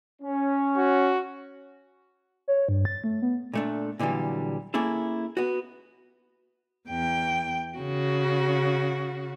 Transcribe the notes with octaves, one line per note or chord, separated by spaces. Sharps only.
C#4
F#4
C#5
G2
A6
A3
B3
A#2 A3 D4
A#2 D3 E3 F#3 G3
A#3 C#4 E4 G#4 A4
B3 F#4
E2 G5
C#3 F#4